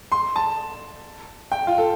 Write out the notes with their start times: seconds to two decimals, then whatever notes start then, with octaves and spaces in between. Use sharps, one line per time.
0.12 C6
0.36 A5
1.52 G5
1.67 F4
1.78 A4